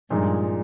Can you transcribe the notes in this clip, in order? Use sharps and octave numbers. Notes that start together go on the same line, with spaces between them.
G2 A#2 F3 G#3 D#4